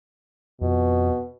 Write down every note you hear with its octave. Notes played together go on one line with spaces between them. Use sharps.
F2 B2